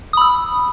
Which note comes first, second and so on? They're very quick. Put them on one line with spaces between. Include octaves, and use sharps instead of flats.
D#6 B5 E6